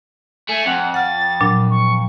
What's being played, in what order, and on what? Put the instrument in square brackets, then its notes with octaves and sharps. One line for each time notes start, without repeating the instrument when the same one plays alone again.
[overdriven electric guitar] A3 [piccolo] G#5
[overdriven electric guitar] F2 [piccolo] F#5
[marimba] F#5 F6 [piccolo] A6
[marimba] A#2 F#3 D4
[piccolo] C#6